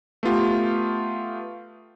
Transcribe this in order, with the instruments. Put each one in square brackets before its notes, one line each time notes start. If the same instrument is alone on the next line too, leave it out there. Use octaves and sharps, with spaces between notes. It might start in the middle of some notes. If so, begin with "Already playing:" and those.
[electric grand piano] A3 B3 F4 G4